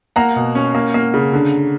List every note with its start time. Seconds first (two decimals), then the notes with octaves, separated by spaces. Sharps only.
0.16 A#3 F#5 A#5
0.36 B2
0.55 C#4
0.75 A#3
0.94 A#3
1.14 C#3
1.33 D3